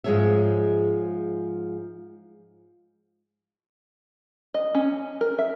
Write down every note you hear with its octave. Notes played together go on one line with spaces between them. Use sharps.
G#2 F3 G#3 G#4 C#5 E5
D#5
C#4
A#4
E5